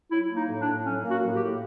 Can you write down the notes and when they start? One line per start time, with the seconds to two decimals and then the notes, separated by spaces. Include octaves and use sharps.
0.11 F#3 E4
0.29 A#3
0.36 D#4
0.49 A2
0.61 D4
0.68 A2
0.85 F#3 C#4
1.04 A#3
1.10 F#4
1.23 A2
1.36 G4
1.42 A2